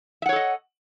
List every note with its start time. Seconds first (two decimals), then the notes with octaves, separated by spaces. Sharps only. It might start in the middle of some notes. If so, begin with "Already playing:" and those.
0.22 E5
0.26 F#5
0.29 C#5
0.33 A4
0.36 D#5